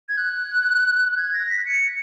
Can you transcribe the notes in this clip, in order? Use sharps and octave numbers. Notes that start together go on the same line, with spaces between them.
G#6
F#6
G#6
A#6
B6
C#7